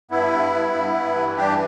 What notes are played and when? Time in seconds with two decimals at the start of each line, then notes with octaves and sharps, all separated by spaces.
0.11 G2 B3 E4
0.32 G2
0.53 G2
0.74 G2
0.95 G2
1.16 E3
1.37 G2 D4 G4